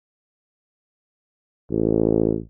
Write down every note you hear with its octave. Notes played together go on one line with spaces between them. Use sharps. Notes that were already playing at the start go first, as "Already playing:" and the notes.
A1